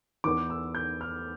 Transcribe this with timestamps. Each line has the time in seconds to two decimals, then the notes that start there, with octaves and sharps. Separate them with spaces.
0.24 E2 E3 D6
0.50 E6
0.75 G6
1.01 F6